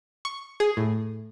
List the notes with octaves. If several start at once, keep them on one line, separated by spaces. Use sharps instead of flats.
C#6
G#4
A2